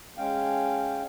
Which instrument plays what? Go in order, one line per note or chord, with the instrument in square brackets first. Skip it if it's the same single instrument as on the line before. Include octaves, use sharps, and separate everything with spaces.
[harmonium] G#3 C#4 F5 G5